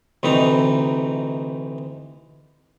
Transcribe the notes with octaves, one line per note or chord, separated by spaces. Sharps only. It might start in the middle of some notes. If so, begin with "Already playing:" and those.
D2 C3 E3 D#4 A#5